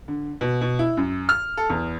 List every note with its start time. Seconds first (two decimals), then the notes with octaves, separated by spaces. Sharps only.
0.08 D3
0.41 B2
0.61 B2
0.79 E4
0.97 F#2
1.29 F6
1.57 A4
1.70 E2